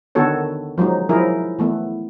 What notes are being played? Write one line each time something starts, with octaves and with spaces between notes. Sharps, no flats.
D3 D#3 B3 F#4 A4 C#5
F3 F#3 G#3 D#4
F3 F#3 D#4 E4 G#4 A#4
E3 A3 B3